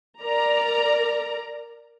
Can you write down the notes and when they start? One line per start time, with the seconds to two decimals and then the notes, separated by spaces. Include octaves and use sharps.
0.22 A#4 D5 A#5